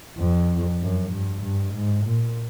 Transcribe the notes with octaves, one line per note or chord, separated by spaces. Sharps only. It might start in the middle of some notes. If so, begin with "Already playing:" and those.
F2
F#2
G2
G2
G#2
A#2